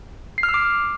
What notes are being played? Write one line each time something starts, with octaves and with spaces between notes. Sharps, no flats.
C7
F6
E6
D6